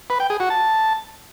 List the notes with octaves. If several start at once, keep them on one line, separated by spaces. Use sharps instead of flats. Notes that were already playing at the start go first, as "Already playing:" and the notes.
B4
G5
G#4
F#4
A5